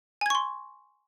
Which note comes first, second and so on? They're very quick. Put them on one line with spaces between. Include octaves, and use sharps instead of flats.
G#5 G#6 C#6 C6